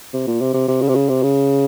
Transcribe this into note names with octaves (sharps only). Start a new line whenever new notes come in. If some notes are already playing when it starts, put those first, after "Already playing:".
C3
A#2
C3
C3
C3
C#3
C3
C#3
C3
C#3